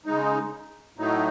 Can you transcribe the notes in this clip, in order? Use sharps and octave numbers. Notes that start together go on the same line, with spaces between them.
C#3 G#3 D#4
A2 F#3 A3 D#4